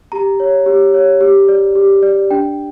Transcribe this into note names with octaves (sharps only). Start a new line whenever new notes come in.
G4 A#5
C#5
G4
C#5
G4
D5
G4
D5
D4 G5